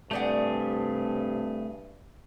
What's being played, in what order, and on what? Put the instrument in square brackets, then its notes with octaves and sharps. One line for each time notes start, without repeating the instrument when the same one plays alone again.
[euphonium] G2 [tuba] C3 [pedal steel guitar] A3 G#4 [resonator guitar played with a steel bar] G4 D5 F#5